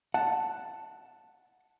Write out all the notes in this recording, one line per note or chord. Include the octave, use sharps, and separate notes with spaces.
F#5 A5